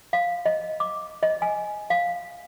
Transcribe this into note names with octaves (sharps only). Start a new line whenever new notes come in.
F5
D#5
D6
D#5
G#5
F5